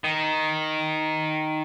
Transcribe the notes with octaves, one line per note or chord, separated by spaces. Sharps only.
D#3